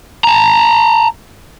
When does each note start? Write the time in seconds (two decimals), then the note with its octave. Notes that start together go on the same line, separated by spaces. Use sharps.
0.24 A5 A#5